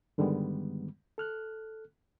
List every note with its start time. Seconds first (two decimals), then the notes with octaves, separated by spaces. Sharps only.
0.18 G2 D3 D#3 G3 G#3 B3
1.18 A4 F6 F#6